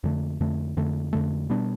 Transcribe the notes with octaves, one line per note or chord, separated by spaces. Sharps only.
F2 D3 A3
F2 D3 A3
F2 D3 A3
F2 D3 A3
B2 G3 B3 D4